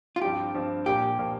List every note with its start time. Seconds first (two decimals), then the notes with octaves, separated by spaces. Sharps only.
0.16 F4
0.22 G2 F3 C4 G4
0.54 G2 F3 C4
0.86 A#2 F3 A#3 G4
1.18 A#2 F3 A#3